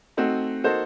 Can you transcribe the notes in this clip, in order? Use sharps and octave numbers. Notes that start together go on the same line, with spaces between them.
A3 C4 D#4 F#4
A#3 D#4 F#4 A4 C5